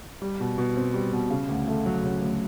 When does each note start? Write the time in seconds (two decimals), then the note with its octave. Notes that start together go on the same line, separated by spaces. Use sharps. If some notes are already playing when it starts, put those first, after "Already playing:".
0.22 G3
0.40 B2
0.58 B2
0.76 C4
0.94 G3
1.13 B2
1.30 C#3
1.49 D2
1.68 A3
1.86 F#3
2.04 C#3
2.22 D2